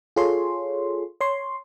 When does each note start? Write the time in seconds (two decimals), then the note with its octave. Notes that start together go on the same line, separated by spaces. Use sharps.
0.16 F4 G#4 A4 C#5 C6
1.21 C#5 C6